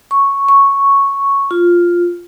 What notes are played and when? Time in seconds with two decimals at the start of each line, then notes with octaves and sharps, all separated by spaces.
0.11 C#6
0.49 C#6
1.51 F4